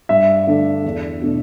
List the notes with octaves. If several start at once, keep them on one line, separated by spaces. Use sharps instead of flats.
G2 E5
D3 A3 D4
E2
B2 A3 D4